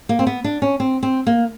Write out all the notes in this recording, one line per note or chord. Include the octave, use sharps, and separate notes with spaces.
A#3
C4
B3
D4
C#4
C4
C4
A#3